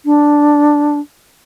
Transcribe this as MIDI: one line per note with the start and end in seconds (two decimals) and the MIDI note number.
0.06 0.99 62